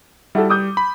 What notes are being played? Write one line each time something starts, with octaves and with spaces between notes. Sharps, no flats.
G3 E4 F#4 A4
D6 D#6 G6
B5